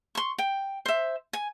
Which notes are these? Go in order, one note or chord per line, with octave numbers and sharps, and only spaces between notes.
C6 C#6
G5
C5 E5
G#5